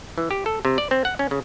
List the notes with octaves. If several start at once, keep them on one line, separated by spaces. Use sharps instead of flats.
E3
G4
A4
C3
D5
C4
F#5
C#4
C#3